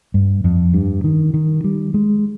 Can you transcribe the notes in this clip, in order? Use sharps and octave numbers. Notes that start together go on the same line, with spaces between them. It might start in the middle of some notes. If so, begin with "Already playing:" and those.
G2
F2
G2
D#3
D#3
G3
G#3